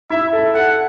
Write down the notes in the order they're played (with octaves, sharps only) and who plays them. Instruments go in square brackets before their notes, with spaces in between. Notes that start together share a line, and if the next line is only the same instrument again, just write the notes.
[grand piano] E4 [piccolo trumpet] E5
[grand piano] A4
[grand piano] A4 [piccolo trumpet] F#5